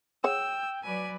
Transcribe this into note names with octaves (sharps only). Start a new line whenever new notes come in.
G#4 C#5 F#5 G5 E6
F#3 B4 D5 G#5